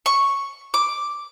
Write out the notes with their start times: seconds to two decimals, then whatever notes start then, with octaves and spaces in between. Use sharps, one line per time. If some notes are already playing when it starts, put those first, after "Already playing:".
0.06 C#6
0.74 D6